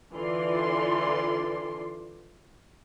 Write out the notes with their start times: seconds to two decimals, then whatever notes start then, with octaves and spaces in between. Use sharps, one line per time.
0.14 D3 E3 F4 D5 C6